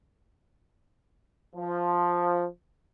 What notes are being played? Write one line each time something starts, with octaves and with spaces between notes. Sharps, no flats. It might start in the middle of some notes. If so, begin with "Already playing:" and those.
F3